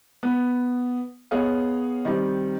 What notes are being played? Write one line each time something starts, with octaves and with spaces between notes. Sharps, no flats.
B3
B3 G#4 C#5 D#5 F5
D#3 G3 C4 D#4